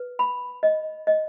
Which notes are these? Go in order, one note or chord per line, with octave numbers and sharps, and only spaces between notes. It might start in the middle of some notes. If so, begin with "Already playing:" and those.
Already playing: B4
B5
D#5
D#5